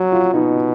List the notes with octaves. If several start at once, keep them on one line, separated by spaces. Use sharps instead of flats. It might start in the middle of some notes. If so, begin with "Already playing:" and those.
Already playing: F#3 F#4
F4
B2 D#4